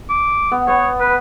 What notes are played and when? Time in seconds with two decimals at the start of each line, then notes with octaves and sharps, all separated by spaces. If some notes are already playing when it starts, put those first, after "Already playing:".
0.10 D6
0.52 B3
0.68 B3 C#5
1.00 B4